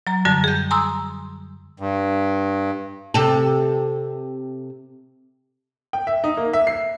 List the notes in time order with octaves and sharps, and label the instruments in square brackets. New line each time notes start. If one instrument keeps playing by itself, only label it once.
[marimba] F#3 A#5
F#2 D3 G3 A5 A6
G#4 G6
G#5 A#5 C6 D#6 E6
[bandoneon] G2
[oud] C3 A4
[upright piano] G5
E5
D#4
A#3
E5
C7